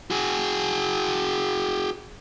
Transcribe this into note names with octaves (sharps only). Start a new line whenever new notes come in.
F#4 G#4